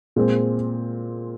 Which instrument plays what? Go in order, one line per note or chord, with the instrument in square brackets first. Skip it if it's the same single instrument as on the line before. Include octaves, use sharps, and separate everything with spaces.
[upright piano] A#2 G#3 C4